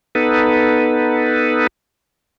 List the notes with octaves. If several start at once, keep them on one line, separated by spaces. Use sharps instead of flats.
B3 D#4 A4 B4